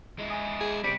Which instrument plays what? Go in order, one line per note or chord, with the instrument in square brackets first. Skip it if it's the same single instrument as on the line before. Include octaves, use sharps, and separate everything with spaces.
[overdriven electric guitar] G#3 E4
[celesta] G#5 D#6
[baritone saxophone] G#4
[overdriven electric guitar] C3 C4 [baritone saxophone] G3 [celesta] B6 C#7 D7